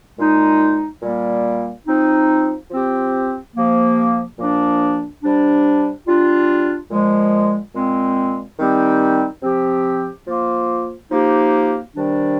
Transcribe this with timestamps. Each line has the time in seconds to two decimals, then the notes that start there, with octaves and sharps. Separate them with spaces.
0.18 A#2 G#3 D#4
1.02 A#2 G3 A#3
1.87 F3 C4 D#4
2.70 F3 C4 G4
3.55 C3 F3 A#3
4.39 A#2 F3 A#3 D4
5.22 C3 G3 D4
6.06 G3 D4 F4
6.90 A#2 F3 G#3
7.74 A#2 G#3 C4
8.58 D#3 G3 C4 D#4 G4
9.42 C3 F3 C4 G4
10.27 F3 A#3 F4
11.10 F3 A#3 D#4 G4
11.94 C3 D#3 G3 D4